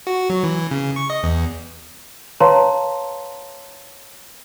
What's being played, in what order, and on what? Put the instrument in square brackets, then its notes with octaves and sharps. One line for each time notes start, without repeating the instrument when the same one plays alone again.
[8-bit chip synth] F#4
F#3
E3
C#3
C#6
D#5
E2
[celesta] B4 C#5 F5 A5 A#5 C6